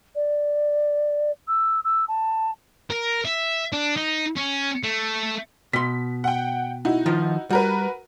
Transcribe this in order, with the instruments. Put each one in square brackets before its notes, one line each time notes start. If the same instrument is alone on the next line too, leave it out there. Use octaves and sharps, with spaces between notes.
[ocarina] D5
E6
E6
A5
[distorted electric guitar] A#4
E5
D4
D#4
C#4
A3
[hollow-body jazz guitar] B2 C6 [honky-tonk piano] B6
[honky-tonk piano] F#5 G5
D#4 E4 F#4
[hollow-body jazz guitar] D#3 F3 F4
[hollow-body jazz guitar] G3 [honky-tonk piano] F#4 A#4 B4